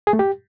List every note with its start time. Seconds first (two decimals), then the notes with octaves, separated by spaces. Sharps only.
0.07 G#4
0.13 A3
0.19 G4